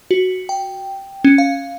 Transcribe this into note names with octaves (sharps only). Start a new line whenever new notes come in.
F#4
G5
C#4
F5